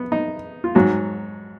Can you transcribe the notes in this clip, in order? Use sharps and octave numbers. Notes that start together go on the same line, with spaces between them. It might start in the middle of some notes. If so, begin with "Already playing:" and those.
Already playing: B3
D#4
F4
G#2 F#3 F#4